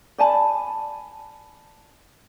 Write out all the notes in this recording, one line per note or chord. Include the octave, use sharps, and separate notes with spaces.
D5 G#5 A5 B5